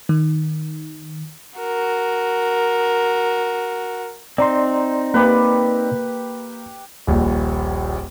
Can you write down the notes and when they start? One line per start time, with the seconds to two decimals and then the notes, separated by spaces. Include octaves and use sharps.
0.09 D#3
1.59 F#4 A#4
4.38 C4 D#4 D5 A#5 C6
5.14 A#3 G4 B4
7.07 D#1 A#1